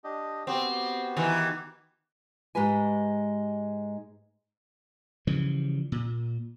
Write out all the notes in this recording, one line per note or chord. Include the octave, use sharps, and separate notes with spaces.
D4 G4 D#5
B3 C4 F#4 G4
D#3 E3
G#2 G#3 G4 B4 G#5
C#3 E3 F3 G3
A#2